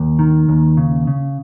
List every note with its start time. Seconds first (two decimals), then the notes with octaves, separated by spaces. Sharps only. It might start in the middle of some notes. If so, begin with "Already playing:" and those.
Already playing: D#2
0.19 D#3
0.49 D#2
0.77 C#3
1.07 C#3